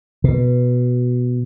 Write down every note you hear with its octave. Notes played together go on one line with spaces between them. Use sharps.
B2